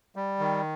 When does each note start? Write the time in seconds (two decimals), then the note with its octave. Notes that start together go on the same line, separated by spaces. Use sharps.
0.16 G3
0.39 D#3